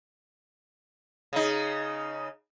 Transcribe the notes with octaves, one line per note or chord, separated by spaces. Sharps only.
C#3 D#4